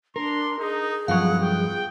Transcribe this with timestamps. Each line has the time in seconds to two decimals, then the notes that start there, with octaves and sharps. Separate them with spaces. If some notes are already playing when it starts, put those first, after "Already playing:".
0.16 D4 A#4 C6
0.60 D#4 G#4
1.08 G2 F3 F#3 F5 F#5
1.42 G5